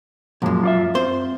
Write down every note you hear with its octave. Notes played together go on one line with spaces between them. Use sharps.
B1 F#2 A#2 F3 G#3
F4 D5 E5
C4 C5